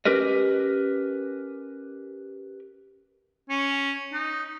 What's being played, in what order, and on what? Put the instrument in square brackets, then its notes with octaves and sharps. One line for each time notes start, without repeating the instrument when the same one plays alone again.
[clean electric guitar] C#4 G4 A#4 B4 D#5
[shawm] C#4
D#4